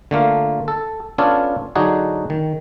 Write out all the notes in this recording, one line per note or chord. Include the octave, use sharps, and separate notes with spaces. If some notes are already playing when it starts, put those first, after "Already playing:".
D3 A3 A#3 F4
A4
B3 C#4 D4 F4 A4 C#5
D3 F#3 D4 D#4 F#4 G#4
D#3